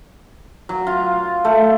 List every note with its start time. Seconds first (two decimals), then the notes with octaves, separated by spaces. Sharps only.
0.69 F#3
0.87 F4
1.45 A3